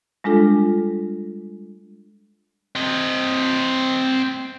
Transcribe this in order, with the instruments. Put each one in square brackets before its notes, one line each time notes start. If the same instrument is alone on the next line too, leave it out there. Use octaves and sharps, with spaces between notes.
[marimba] G3 G#3 D4 F4 A4
[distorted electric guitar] C4 D#5